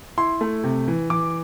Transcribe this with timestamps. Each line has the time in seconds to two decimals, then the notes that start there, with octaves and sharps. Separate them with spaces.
0.17 E4 C6
0.41 A3
0.64 C3
0.88 E3
1.10 E3 D6